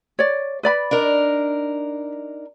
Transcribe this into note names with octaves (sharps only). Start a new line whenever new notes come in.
C#5 D5
B4 D5 B5
D4 D#4 A#4